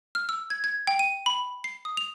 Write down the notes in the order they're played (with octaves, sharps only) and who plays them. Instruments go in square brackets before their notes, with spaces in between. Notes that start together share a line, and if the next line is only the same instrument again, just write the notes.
[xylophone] F6
E6
G#6
G#6
G5
D#7
B5
C7
D#6
F7